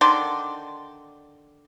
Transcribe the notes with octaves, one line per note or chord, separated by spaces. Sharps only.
D3 D#3 D5 C6